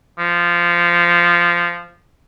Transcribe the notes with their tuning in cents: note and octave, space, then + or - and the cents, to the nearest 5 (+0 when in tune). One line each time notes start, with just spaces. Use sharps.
F3 -10